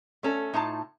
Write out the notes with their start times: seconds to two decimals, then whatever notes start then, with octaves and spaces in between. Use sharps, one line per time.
0.23 A3 C#4 A4
0.54 A2 D#4 F4 A5